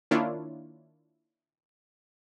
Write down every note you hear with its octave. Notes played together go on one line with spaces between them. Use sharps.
D#3 A#3 D4 E4 F4 C#5